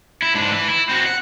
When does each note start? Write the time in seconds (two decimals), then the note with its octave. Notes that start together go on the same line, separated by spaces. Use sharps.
0.22 E4
0.34 G#2 D4
0.51 E3
0.69 E4
0.89 C4 F#4
1.06 F#5